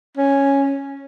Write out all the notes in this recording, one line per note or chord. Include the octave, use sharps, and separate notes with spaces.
C#4